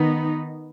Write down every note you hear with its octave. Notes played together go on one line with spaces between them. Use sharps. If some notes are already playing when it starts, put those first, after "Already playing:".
Already playing: D#3 B3 D#4